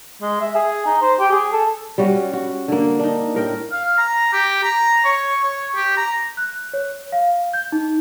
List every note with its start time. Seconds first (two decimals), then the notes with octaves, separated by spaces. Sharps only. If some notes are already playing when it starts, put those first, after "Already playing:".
0.22 G#3
0.41 E5
0.55 G#4
0.86 D#4
1.02 C5
1.19 G4
1.31 G#4
1.53 A4
1.98 G3 C#4 F#4
2.33 F#4
2.68 D3 A#3
2.99 D4 D#4
3.34 A2 A#4 G5
3.71 F5
3.98 A#5
4.33 G4
4.63 A#5
5.04 C#5
5.42 C#5
5.75 G4
5.97 A#5
6.37 F#6
6.74 C#5
7.12 F5
7.53 G6
7.72 D#4